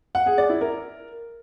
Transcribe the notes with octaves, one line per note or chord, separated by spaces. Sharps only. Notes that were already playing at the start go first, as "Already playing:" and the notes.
F#5
G#4
D5
E4
A#4